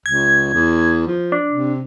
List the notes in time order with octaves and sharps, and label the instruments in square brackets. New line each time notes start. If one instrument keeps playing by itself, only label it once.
[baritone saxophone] C#2 [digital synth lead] G#6
[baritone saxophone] E2
F3
[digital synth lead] D4
[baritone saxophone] C3